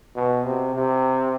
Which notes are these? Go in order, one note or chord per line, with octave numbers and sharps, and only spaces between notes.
B2
C3
C3